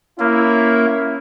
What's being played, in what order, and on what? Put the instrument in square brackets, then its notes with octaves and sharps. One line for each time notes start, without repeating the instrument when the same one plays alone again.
[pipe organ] A#3 [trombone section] C#4 E4